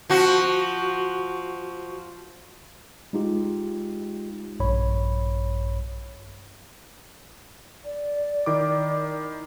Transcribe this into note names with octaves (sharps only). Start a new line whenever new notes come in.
F3 F#4
G#3 D#4 F4 G4
A#1 G2 C#5 B5
D5
D#3 E4 D6